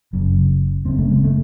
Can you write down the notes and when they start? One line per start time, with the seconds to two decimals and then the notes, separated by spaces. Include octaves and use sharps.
0.13 F#1 F#2 C#3
0.85 F#1 F#2 C#3 C4
0.98 A3
1.11 G#3
1.24 A3